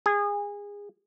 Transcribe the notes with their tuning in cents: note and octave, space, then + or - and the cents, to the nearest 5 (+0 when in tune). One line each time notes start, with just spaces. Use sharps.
G#4 -25